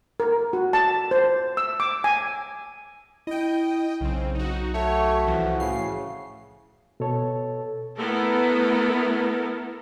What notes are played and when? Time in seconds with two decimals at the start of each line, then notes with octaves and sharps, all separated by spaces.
0.20 A#4
0.53 F#4
0.73 A5
1.11 C5
1.57 E6
1.80 D6
2.04 G#5
3.27 E4 D#5 G5
4.01 B1 C#3 C4
4.35 D#4 F#4
4.74 A3 F#4 C#5
5.25 C2 E3 F3
5.60 A2 C#3 C7
7.00 B2 A4 C#5
7.98 A3 B3 E4 A4 A#4